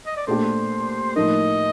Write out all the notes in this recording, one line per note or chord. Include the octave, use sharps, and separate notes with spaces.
D#5
D5
A#2 A3 D4 G4 C5
A2 F3 A#3 D#4 A#4 D#5